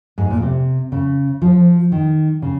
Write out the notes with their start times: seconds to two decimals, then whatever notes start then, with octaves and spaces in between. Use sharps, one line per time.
0.18 G#2
0.30 A#2
0.42 C3
0.92 C#3
1.42 F3
1.92 D#3
2.42 C#3